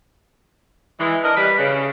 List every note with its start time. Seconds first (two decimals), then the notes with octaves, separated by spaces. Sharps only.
0.99 E3 G#3
1.24 D4 A#4 D#5
1.37 G3 B4
1.58 C#3